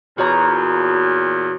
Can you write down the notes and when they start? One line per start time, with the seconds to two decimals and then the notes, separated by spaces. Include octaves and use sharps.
0.18 E2 A#2 F#4 C#5 A#5